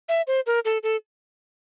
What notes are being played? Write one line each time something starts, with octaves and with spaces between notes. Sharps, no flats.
E5
C5
A#4
A4
A4